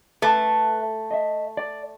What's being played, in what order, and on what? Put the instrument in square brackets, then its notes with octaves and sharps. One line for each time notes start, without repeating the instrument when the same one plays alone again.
[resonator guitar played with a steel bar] A3 [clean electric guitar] B4 E5 A5
[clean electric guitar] D#5 E5
D5